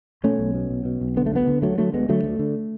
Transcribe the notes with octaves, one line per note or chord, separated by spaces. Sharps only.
B2 A3 C#4
B1
B2
B1
B2
B1
D3 B3
A3
D2 G#3 B3
D3
D2 F#3 A3
D3 F#3 A3
D2 G#3 B3
D3 F#3 A3
D2
D3